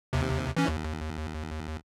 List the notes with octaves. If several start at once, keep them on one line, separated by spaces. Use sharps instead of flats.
D#2 C3
E3 C#4
D#2